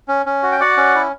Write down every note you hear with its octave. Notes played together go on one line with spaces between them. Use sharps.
C#4
C#4
F#4
G5
F#4 D5 F#5
C#4
E4